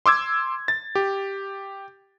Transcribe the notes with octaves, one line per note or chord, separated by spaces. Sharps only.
C6 D6 E6 G#6
A6
G4